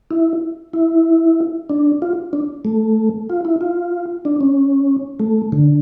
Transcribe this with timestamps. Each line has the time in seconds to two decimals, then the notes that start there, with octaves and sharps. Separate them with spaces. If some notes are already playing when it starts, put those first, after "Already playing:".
0.11 E4
0.73 E4
1.69 D4
2.02 F4
2.33 D4
2.65 A3
3.30 F4
3.45 E4
3.61 F4
4.25 D4
4.41 C#4
5.20 A3
5.52 D3